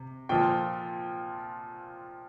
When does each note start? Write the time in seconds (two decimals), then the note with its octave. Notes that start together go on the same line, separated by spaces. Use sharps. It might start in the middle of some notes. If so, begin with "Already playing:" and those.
Already playing: C3
0.29 A#2 F3 G5